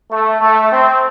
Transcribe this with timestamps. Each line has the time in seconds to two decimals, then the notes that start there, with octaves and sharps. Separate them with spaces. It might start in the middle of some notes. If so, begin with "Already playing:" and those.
0.11 A3
0.41 A3
0.72 C4